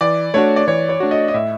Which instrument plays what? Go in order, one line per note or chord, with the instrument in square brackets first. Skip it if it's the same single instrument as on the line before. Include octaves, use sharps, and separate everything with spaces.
[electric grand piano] E3 [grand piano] D5
[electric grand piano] A3 D4 F#4 [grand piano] C#5
[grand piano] D5
[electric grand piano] E3 [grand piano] C#5
[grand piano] C#5
[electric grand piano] A3 D4 F#4
[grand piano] D#5
D#5
[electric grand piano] A2 [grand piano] E5